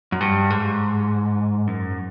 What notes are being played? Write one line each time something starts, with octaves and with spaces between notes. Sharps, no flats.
F#2
G2
G#2
F#2